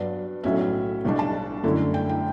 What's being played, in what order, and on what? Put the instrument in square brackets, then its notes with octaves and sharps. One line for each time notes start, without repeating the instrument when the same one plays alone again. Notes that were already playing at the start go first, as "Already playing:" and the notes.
Already playing: [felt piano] G2 F#3 B3 D4 D5
B1 A2 F#3 C#4 E5
B1 B2 G3 D4
A5
F#2 D3 A3 E4
G5
G5